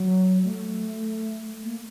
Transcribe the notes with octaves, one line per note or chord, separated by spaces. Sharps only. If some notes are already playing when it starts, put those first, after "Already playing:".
Already playing: F#3
A3
A#3